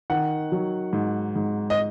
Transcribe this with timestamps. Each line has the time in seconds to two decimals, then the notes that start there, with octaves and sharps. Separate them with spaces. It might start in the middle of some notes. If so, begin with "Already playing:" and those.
0.10 D#3 F#5
0.52 F#3
0.93 G#2
1.36 G#2
1.70 D#5